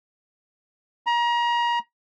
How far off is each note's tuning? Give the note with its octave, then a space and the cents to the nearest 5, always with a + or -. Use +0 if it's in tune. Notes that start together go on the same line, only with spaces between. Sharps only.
A#5 +30